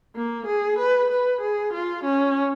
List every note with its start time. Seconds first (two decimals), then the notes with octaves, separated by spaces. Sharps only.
0.16 A#3
0.47 G#4
0.79 B4
1.11 B4
1.41 G#4
1.73 F4
2.04 C#4